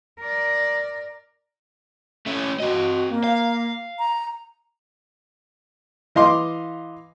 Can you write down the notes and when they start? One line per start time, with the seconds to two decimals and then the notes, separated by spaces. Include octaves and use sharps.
0.20 A#4 D5
2.26 A3 C#4
2.60 C4 F#4 D#5
3.09 A#3
3.24 F5
3.99 A#5
6.15 E3 D#5 F5 C6 D6